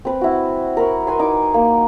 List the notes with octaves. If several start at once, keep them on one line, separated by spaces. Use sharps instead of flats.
C4 B4
E4 F#4
A#4 B5 C#6
B4 G#5 C6
D#4 D6
A#3